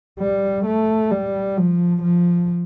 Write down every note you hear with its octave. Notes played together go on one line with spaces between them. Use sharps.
G3
A3
G3
F3
F3